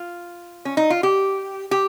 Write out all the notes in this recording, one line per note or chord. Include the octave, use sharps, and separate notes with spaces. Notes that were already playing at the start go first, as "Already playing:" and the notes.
Already playing: F4
C#4
D#4
F4
G4
G4